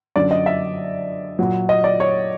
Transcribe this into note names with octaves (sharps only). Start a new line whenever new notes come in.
F#2 D3 F#3 D5
D#5
E5
A#2 F#3
D#5
D5
C#5